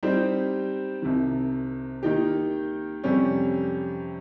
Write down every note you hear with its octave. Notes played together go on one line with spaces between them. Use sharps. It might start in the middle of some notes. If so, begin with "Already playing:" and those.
G3 C4 D#4 G4 C5
C2 C3 D#3
D#3 A#3 D#4 G4
F2 C3 G3 C#4 G4